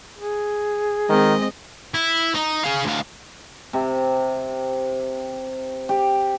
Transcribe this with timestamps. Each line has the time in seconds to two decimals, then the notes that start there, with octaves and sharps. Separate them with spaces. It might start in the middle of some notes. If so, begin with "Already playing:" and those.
0.19 G#4
1.09 D#3 G#3 C4 D#5
1.94 E4
2.34 D#4
2.63 G#4 F5
2.85 D2 F5
3.73 C3
5.89 G4